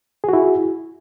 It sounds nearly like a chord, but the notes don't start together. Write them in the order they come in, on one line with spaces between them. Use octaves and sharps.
G#4 F#4 E4